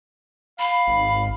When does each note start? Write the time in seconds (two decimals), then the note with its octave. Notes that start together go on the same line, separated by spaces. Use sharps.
0.59 F5 B5
0.87 G#1